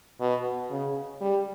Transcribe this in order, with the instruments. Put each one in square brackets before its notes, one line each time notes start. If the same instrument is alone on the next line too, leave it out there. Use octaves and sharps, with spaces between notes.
[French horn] B2
C#3
G3